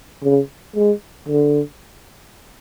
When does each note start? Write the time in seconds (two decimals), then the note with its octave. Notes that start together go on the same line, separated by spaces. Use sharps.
0.23 C#3
0.76 G#3
1.29 D3